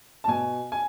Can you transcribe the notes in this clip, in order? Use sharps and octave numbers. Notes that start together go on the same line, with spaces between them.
A5
B2 G#5
G#5